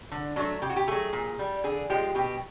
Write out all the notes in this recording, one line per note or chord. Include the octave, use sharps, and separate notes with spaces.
D3
F#3 A3 D4
C#3 G4
F#4
G4
F#3 A3 G#4
A#2
G3
D3 G#4
F3 G#3 G4
B2 G4